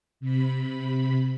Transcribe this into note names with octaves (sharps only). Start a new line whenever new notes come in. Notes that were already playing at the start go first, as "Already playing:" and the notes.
C3 B5